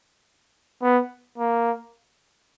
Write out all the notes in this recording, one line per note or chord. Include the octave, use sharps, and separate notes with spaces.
B3
A#3